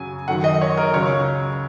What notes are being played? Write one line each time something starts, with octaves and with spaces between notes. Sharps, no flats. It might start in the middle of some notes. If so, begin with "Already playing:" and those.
Already playing: F#2 C#3 F#3 G#5
F#2 D#3 F#3 F#5
D#5
C#5
A#4
C#2 C#3 F#3 C#5